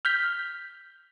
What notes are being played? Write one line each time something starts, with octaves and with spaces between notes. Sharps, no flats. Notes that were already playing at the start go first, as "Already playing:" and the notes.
F6 G6 B6